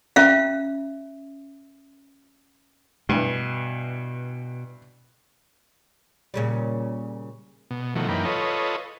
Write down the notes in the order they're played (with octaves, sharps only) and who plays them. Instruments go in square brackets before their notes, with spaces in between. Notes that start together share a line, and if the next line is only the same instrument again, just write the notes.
[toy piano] C#4 E5 F5
[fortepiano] G2 E3 [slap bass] B2
[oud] A#2 C#3 G3
[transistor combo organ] B2
B2 D#3 F3 A3 F#4
F#2 E3 A#3 D#4 B4 G5
F4 A4 B4 C#5 D#5